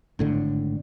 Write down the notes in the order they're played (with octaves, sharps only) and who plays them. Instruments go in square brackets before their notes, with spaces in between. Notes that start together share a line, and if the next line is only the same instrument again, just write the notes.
[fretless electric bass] G#1 A2 D3